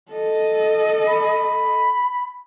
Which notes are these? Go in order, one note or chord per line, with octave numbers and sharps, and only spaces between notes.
A4 D#5
B5